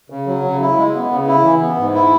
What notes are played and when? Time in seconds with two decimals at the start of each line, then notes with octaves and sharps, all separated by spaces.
0.10 C#3
0.27 F#3
0.44 C#3
0.60 E4
0.77 G#3
0.94 B3
1.11 C#3
1.27 E4
1.44 E3
1.61 B3
1.78 G#2
1.94 E4